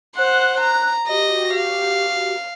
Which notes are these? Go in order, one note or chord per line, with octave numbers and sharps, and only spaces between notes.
C5 F#5 F#6
A#5
F#4 G4 D#5 A#6
F5